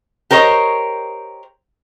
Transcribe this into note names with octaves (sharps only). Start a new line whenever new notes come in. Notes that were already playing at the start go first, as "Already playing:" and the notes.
G4 A#4 C5 C#5 D#5